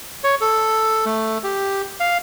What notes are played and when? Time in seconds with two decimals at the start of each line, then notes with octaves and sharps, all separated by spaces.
0.24 C#5
0.41 A4
1.06 A3
1.44 G4
2.00 F5